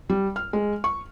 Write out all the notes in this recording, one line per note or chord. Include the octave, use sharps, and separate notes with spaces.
G3
F6
G#3
C#6